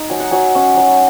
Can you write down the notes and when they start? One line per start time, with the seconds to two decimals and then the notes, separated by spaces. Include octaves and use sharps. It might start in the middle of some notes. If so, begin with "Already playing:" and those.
Already playing: D#4 A#5
0.10 F#3 G#5
0.20 F#5
0.31 F#3 G#5
0.55 C#4
0.77 F#3